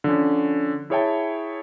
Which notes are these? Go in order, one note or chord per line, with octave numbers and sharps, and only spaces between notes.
D3 F3 C#4
E4 G#4 C#5 E5 G5 A5